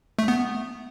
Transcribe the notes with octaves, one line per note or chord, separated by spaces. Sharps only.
A3
B3